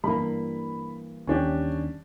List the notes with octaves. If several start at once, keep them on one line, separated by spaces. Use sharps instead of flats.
G2 E3 G3 A#3 E4 B5
D#2 C#4 D4 G4